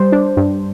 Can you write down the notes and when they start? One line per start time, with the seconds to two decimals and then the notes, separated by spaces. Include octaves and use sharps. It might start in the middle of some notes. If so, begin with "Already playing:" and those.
Already playing: G3 C5
0.12 D4
0.37 G2